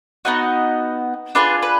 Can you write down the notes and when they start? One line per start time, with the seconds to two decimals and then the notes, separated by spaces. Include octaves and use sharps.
0.25 B3 D#4 F#4 D#5
1.35 D4 F4 G#4 B4
1.62 B4